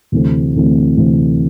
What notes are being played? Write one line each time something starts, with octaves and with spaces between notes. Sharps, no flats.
D2 C3 E3 A3 C4
D2 C3 E3 A3 C4
D2 C3 E3 A3 C4